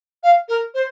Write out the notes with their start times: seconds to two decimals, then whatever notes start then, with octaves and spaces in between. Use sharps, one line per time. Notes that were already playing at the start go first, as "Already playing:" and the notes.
0.23 F5
0.49 A#4
0.74 C5